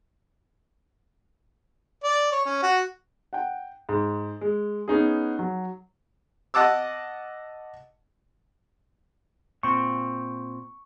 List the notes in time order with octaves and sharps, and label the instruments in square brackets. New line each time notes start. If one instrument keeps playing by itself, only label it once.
[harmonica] D5
C#5
C#4
F#4
[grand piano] F#5 G5
G#2
G#3
B3 C#4 D#4 G#4
F#3
[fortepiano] D#5 F#5 A5 D6 E6
[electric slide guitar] A#2 C4 [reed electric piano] C#6